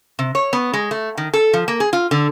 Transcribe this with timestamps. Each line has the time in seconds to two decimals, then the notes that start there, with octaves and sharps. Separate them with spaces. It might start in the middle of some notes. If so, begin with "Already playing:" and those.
0.19 C3
0.35 C#5
0.53 B3
0.74 G#3
0.91 A3
1.18 D#3
1.34 A4
1.53 F3
1.68 A#3
1.80 G#4
1.93 F4
2.11 D3